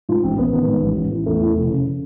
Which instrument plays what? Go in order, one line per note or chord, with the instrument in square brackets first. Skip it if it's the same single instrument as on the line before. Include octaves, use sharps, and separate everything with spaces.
[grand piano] G#2 F4
A1 C4
A1 B3
D#3 B3
G#2
A1
A1
E3
E2 A3
E3
F1
C#3